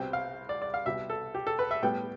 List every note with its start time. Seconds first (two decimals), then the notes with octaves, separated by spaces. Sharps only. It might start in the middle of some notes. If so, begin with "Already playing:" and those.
Already playing: C2 B2 G3 C4 G5
0.13 F5
0.49 D5
0.62 D5
0.74 F5
0.86 C2 B2 G3 E5
1.10 A4
1.35 G4
1.47 A4
1.59 B4
1.71 E5
1.83 A2 G3 B3 G5